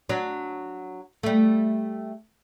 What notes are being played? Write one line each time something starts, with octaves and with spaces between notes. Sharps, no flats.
F#3 D4
G3 A3